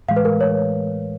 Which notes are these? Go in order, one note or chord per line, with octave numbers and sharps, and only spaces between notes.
A2 E3 G#3 F5
B4
A#4
C#5